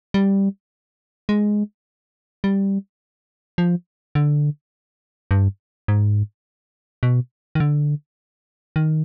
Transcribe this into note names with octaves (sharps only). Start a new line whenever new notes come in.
G3
G#3
G3
F3
D3
G2
G#2
B2
D#3
D3
D#3